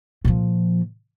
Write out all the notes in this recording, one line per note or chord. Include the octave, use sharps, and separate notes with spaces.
A#2 F3